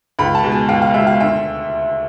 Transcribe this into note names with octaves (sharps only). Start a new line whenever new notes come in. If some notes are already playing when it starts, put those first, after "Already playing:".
C#2 B5
A5
B2 G#3
G#5
C#2 F5
F5
B2 G#3 E5
F5
D2 E5